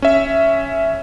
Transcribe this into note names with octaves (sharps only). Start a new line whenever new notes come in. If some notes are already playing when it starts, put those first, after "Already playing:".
C#4 E5